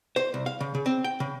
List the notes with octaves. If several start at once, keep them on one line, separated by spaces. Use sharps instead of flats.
C5
C2
F5
C#3
C#3
C4
G5
C#3